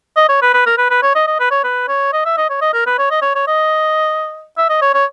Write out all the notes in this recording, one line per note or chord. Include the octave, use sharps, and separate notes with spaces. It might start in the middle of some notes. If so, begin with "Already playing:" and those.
D#5
C#5
B4
B4
A#4
B4
B4
C#5
D#5
D#5
B4
C#5
B4
C#5
D#5
E5
D#5
C#5
D#5
A#4
B4
C#5
D#5
C#5
C#5
D#5
E5
D#5
C#5
C#5